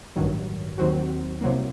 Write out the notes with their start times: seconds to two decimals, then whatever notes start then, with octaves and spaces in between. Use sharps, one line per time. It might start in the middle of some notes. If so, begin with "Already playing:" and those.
0.16 A1 G2 D#3 F#3
0.78 D#2 D#3 F#3 C4 F#4
1.41 C2 C3 F#3 A#3